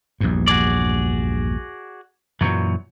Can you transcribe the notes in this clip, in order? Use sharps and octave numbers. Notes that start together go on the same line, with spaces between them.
A#1 E2 G2
F#4 G#4 D5
F#2 A#2 E3 F#3